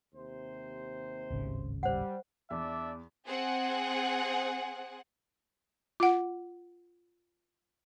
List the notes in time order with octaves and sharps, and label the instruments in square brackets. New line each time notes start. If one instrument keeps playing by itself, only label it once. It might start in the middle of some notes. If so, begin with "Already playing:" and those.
[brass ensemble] D#2 C3 C5
[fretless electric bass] D1 G#1 C#3
[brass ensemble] G3 [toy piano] C5 F#5
[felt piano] E2 [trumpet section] D4 D5 E5
[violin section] C4 G#4 F#5
[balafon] F4 F#5